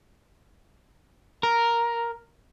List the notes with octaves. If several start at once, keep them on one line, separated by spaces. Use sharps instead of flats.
A#4